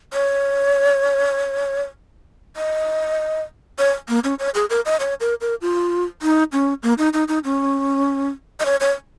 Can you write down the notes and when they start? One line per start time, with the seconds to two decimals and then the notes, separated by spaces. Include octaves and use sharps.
0.14 C#5
2.57 D#5
3.79 C#5
4.09 A#3
4.24 C#4
4.39 C#5
4.55 G#4
4.70 A#4
4.86 D#5
5.00 C#5
5.20 A#4
5.41 A#4
5.62 F4
6.22 D#4
6.53 C#4
6.83 A#3
6.98 D#4
7.13 D#4
7.28 D#4
7.44 C#4
8.60 D#5
8.66 C#5
8.80 C#5